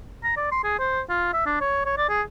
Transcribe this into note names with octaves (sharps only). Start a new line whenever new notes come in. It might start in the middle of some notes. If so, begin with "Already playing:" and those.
A#5
D5
C6
G#4
C5
F4
E5
D4
C#5
C#5
D5
G#4